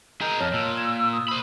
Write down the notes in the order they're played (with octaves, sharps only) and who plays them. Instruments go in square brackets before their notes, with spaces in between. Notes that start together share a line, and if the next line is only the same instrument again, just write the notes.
[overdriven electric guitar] G#4 A#4 [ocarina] D#5 [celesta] A#5 G6
[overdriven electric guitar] F2 [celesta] C#5 A5 F6
[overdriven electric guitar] A#2 [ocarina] E6
[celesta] G#6 E7
[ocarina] D#6 [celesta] E6
[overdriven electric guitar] C5 B5